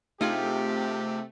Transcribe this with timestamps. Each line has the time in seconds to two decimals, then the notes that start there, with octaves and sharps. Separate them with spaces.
0.21 C3 A3 D#4 F4 G4 G#4